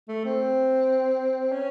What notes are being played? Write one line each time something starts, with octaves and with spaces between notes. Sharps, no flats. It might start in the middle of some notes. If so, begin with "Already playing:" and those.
A3
C4
C#4